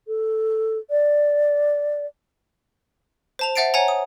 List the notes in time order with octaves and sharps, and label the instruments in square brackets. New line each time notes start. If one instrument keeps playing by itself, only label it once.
[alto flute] A4
D5
[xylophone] C5 A5 F7
C5 E5 F#5 A6 C7 D7
C#5 F#5 G#5 A#5
D#6